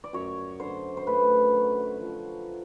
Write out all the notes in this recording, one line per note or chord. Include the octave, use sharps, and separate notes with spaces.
D5
F#2 C#5
D3 C5
C5
A3 B4
F#3
F3